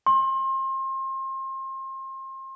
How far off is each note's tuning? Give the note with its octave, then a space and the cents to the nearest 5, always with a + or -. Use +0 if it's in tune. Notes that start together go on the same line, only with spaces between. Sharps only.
C6 +35